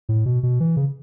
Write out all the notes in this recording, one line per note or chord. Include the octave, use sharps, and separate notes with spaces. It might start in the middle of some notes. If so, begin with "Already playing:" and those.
A2
B2
B2
E3
C#3